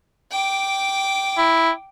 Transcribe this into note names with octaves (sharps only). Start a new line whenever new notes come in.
G5 D6
E4